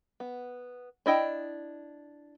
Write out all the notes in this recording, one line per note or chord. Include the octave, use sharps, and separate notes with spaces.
B3
D4 E4 D#5 G5